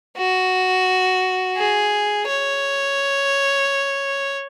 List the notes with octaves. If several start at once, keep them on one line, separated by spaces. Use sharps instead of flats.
F#4
G#4
C#5